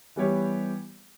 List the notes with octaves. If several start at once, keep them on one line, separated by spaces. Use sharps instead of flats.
E3 G3 B3 G4 C#5